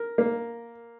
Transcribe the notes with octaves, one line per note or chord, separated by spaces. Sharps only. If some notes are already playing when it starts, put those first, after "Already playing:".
Already playing: A#4
A#3